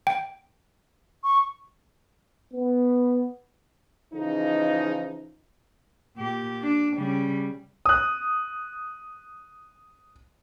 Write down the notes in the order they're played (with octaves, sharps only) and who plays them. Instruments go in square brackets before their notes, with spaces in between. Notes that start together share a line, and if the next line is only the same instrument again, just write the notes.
[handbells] G5
[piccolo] C#6
[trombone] B3
[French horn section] C#3 E3 F3 D#4
[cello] A#2 G4
D4
C#3 G3
[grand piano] D#6 F#6